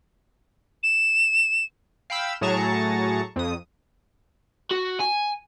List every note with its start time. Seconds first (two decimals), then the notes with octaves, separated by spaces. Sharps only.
0.83 E7
2.10 F5 G5 B5 E6
2.41 A2 F#3 G#4 A5 A#5 C#6
3.36 F2 D#6
4.71 F#4
5.00 G#5